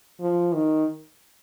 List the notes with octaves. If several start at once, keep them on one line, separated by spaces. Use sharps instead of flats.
F3
D#3